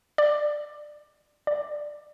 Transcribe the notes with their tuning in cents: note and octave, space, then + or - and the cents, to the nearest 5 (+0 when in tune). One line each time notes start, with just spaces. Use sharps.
D5 +20
D5 +10